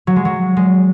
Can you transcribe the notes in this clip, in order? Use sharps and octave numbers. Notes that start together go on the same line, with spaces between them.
F#3
G#3
F#3
G#3